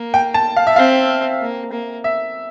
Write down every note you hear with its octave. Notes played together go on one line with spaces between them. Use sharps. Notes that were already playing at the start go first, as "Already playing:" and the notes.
Already playing: A#3
G5
A5
F5
E5
C4 F5
A#3
A#3
E5